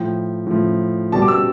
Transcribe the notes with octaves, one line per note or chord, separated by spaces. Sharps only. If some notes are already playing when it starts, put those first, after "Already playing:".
Already playing: A2 F3 G5
A2 F3
B2 G3 A5
D6
E6